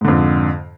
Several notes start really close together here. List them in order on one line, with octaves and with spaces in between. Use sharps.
G#2 D3 F2